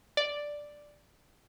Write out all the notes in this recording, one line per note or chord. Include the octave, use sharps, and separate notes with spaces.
D5